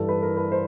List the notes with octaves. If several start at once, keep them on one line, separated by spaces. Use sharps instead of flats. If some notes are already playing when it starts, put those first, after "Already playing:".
Already playing: G2 E3 A4
B4
A#4
B4
C5